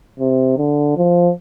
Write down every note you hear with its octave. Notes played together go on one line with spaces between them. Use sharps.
C3
D3
F3